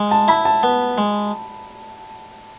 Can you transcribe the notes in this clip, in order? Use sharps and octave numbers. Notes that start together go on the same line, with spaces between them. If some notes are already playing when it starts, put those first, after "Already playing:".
Already playing: G#3
A5
E4 B5
A5
B3
G#3